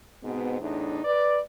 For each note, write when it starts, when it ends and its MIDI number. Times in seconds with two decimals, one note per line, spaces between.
0.23 0.59 44
0.23 0.59 47
0.23 0.59 59
0.23 0.59 60
0.61 1.00 40
0.61 1.00 45
0.61 1.00 62
0.61 1.00 63
1.04 1.40 71
1.04 1.40 74